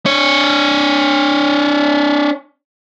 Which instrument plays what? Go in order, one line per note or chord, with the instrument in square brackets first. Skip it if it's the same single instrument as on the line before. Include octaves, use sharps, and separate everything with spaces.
[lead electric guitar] D4 C#5